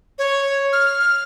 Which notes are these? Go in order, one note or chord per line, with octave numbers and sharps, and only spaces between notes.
C#5
F6